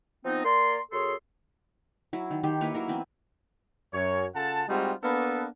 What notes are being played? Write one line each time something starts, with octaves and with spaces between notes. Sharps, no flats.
F3 B3 C4 D#4
A#3 D5 A#5 C6
F#2 G#4 A4 C#5 C6
F#3 E4
D#3
D#3 G4 C6
A#3 E4 B4 C#5
F#3 E4 A#4
E3 B3 C4
F#2 C#5
C#3 F4 A4 F#5 A5
G3 G#3 C4 D#4 F4 F#4
A#3 B3 D4 A4 B4